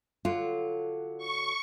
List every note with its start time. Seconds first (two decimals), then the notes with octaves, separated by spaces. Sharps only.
0.25 D3 F#3 F4
1.18 C#6